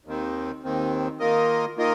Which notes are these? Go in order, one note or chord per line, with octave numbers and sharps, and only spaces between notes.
D#2 D#3 C4
D#2 D#3 C4
D#3 A#3 F4 A#4 D#5
D#3 A#3 F4 A#4 D#5